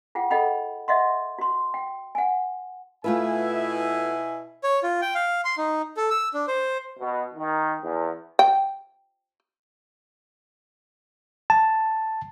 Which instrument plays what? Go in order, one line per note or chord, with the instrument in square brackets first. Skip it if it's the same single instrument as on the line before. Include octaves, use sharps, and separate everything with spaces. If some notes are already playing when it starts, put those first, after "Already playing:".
[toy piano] F4 G#4 F#5 G5
G#4 A4 D#5 F#5 G5 B5
D#5 E5 F#5 C6
F#4 C6
G5
F#5 G#5
[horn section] B2 E4 G#5 [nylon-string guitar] A3 F4 B4
[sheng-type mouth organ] C#5
F4
G5
F5
C6
D#4
A4
E6
D4
C5
[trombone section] B2
D#3
E2
[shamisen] G5
[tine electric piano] A5